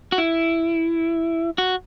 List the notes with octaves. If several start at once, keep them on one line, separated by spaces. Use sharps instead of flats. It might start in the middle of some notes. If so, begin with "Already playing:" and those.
F#4
E4
F#4